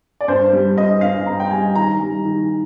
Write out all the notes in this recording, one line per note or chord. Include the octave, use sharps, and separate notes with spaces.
D5
G2 C5
G3
G2 D#5
G2 F5
G2 A#5
G5
G3 G#5
D#3 A#5
G3
D#3